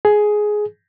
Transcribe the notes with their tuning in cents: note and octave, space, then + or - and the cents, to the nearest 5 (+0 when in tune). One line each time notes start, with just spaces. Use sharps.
G#4 +10